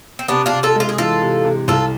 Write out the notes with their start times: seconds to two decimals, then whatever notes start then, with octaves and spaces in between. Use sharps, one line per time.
0.19 C4
0.28 C3 B3 D4
0.46 D4 F4
0.52 C3
0.63 F4 A4
0.75 G#3 F4
0.89 G#4
0.98 E3 F4 A4
1.22 C3
1.45 C3
1.68 C2 F4 A4